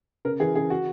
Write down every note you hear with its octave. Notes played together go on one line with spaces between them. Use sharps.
C#3 A#4
E3 G#4
C#3 G#4
F#4